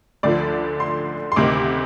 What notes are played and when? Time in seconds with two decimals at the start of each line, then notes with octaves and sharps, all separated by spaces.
0.23 D2 D3 F3 D5
0.80 C6
1.32 C6
1.36 D2 C3 D#3 D6